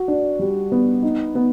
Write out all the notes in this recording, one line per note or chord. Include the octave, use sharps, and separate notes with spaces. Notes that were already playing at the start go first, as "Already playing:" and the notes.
Already playing: F#4
D4
G3
B3
D#4
B3